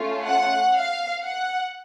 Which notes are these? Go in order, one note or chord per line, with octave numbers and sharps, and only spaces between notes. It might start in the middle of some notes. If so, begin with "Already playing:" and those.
Already playing: A3 C#4 F4
F#5
F5
F#5